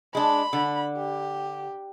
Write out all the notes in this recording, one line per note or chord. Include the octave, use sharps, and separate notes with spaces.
G#3 D4 B5
D3
G4